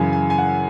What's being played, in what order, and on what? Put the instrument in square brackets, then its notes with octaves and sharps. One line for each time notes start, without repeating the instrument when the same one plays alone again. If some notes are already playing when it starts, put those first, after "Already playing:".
Already playing: [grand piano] F#2 C#3 E3 G#5
G#5
G#5
F#5